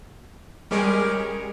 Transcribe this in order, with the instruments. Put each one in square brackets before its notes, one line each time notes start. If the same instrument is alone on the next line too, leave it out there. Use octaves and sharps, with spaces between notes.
[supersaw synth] G3 G#3 G#4 [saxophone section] C#4 G4 A#4